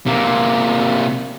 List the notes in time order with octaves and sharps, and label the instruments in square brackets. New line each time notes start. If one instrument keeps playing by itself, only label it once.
[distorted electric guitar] C3 A#3